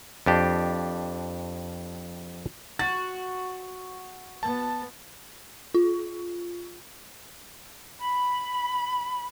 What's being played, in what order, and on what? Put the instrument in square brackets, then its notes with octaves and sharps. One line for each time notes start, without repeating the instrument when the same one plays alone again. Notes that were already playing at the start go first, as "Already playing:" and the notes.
[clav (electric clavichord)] F2 D4 G4
[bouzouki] F#4 [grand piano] A6
[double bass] B3 [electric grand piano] A5
[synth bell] F4
[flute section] B5